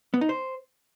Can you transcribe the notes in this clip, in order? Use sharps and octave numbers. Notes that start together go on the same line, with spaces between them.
B3
D#4
C5